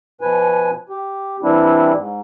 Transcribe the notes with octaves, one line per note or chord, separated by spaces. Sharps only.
B2 F3 B4 G#5
G4
E3 G3 C4 D4 E4
G#2